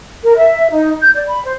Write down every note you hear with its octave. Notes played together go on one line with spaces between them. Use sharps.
A#4
E5
D#4
G6
D5
B5
C5